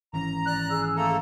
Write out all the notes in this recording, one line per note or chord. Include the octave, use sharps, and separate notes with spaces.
G#1 E3 C#4 A#5
D5 F#6
G#4 E6
A3 A#3 A4 A#5